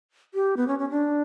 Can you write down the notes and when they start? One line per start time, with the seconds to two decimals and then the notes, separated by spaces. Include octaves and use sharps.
0.34 G4
0.57 B3
0.68 C#4
0.79 C#4
0.90 D4